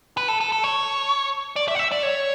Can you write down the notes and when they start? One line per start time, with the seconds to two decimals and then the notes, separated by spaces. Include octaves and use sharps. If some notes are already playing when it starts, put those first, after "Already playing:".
0.17 B4
0.28 A4
0.41 A4
0.52 A4
0.64 C#5
1.56 D5
1.68 E5
1.75 F#5
1.79 E5
1.92 D5
2.03 C#5